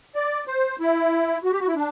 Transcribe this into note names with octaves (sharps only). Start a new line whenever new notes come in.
D5
C5
E4
F#4
G4
F#4
E4
D4